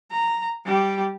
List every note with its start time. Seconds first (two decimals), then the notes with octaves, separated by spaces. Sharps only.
0.11 A#5
0.65 G3 G4